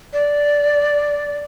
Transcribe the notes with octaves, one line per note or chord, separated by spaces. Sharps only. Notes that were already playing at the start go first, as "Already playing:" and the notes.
D5